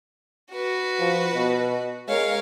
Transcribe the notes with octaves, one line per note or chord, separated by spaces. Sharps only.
F#4 B4
F3
B2
G#3 A#4 C#5 F5